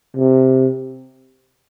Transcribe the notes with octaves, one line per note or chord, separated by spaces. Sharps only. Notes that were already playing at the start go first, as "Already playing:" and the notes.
C3